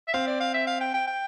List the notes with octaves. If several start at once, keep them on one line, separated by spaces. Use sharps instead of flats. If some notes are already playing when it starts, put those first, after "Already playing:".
E5
C4 F5
D5
F5
E5
F5
G5
G5
G5